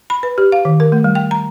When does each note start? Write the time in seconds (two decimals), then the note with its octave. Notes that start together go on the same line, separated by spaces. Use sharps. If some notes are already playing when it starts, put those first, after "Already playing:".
0.10 B5
0.23 B4
0.38 G4
0.52 F5
0.65 D#3
0.80 A#4
0.92 A3
1.04 G3
1.15 G5
1.31 A#5